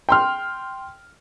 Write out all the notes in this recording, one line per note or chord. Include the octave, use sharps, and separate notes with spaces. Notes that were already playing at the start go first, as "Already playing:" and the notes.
G5 C6 F6